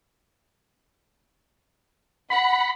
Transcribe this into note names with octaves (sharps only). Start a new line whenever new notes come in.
F#5 B5